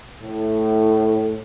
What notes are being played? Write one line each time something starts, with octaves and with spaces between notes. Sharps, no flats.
A2